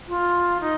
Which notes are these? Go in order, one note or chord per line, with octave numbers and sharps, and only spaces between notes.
F4
D#4